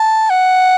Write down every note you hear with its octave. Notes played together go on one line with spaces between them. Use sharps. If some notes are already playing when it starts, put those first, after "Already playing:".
Already playing: A5
F#5